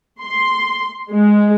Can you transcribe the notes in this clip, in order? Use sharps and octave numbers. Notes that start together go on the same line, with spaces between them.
C6
G#3